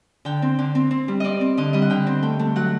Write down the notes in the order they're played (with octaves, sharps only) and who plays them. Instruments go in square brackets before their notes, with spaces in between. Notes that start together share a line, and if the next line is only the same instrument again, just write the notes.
[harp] D3 G5
C4
D3
C4
C4
G3
C4 D5 D#5
C4
D3 D#5
G3 D#5
F#5
D3 G5
C4
A3 G5
A3
F#3 F#5